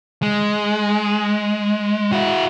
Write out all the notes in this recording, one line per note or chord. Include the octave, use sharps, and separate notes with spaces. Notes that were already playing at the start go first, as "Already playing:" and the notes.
G#3
E4 F#4